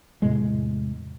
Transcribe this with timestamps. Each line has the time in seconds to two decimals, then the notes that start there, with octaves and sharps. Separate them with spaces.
0.22 E2 A2 C3 G#3